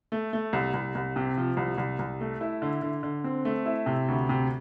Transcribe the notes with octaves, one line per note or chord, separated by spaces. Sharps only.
A3
A3
C2
C2
C2
C3
F3
C2
C2
C2
A3
E4
D3
D3
D3
C4
A3
E4
C3
D2
C3